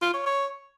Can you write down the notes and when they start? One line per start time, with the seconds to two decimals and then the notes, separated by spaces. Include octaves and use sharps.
0.02 F4
0.14 C#5
0.26 C#5